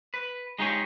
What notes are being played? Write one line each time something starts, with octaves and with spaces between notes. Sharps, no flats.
B4
G#3 D#4 G4 G#4 C#5